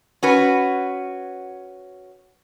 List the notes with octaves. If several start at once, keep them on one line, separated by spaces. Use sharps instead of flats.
C#4 F#4 B4